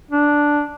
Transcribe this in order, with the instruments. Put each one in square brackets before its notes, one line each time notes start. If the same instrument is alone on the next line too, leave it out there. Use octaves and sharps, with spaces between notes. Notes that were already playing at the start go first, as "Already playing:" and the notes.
[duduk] D4